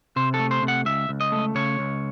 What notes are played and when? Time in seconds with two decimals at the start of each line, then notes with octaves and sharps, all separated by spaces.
0.16 C3 C5
0.34 A4
0.40 A3
0.51 C5
0.63 C3
0.68 F#5
0.85 C#2 E5
1.09 C#2
1.21 D#5
1.32 A3
1.55 C#3 C#5
1.79 C#2